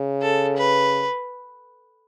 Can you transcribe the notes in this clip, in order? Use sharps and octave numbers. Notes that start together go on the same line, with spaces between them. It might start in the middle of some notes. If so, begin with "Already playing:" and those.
Already playing: C#3
A4
B4